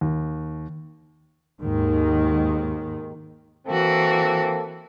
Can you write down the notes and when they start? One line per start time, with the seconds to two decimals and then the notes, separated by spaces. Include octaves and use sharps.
0.01 D#2
1.61 D#2 G#2 D#3
3.68 E3 A#3 C4 F#4 A4